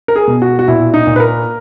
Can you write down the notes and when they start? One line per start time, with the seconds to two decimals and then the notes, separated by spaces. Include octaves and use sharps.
0.08 A#4
0.16 G#4
0.27 B2
0.42 F#4
0.59 F#4
0.68 A#2 E4
0.94 D#4
1.07 A#2
1.16 B4
1.20 A#4